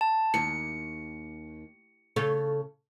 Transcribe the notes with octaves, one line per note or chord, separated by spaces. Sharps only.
A5
D#2 C#7
C#3 A4 C#5